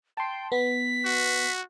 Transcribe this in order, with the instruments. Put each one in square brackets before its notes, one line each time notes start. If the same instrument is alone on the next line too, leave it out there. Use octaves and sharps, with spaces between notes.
[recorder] G5 [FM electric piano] A5 C6
[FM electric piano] B3 [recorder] B6
[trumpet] F#4